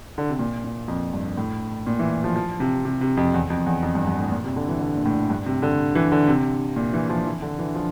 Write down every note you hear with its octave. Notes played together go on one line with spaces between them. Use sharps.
D3
C3
A#2
A#2
F2
G2
A2
A#2
E3
F3
F3
C3
C3
C3
F2
E2
F2
E2
F2
G2
G2
A2
A#2
C3
D3
E3
D3
A#2
A2
G2
C3
D3
E3
D3
C3
A#2
E3
F3
E3
D3
E3
F3